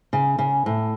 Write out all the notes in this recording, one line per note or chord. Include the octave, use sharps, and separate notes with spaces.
C#3
C#3
A2